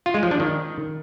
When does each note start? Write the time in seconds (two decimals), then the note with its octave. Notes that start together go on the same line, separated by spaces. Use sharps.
0.06 F4
0.14 G#3
0.23 F3
0.31 D4
0.40 D#3